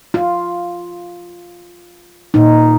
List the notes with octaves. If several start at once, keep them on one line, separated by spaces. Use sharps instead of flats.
F4
A#2 D#4